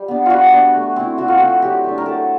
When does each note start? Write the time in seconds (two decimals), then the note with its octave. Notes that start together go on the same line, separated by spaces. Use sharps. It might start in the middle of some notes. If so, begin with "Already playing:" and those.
Already playing: G3
0.08 B3 D4
0.26 G3 F4 F#4
0.52 B3 D4
0.74 A3
0.96 C4 E4
1.18 A3 F#4
1.28 F4
1.38 C4 E4 F#4
1.62 F#3 G4
1.84 A3 D4
1.98 A#4
2.06 F#3 A4